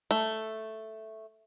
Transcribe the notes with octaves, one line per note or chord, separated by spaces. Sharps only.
A3